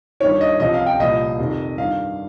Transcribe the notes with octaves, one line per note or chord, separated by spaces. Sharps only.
G2 D#3 C#5
D#5
C2 C3 F3 D#5
F5
G5
C2 A#2 F3 D#5
F2 C3 D#3
G2 D#3 F5